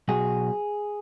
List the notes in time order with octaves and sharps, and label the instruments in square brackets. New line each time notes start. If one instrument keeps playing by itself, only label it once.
[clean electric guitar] B1 F#4 G#4